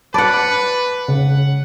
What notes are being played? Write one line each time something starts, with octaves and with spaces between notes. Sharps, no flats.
B4 D5 F#5 A5 B5
C#3 F#5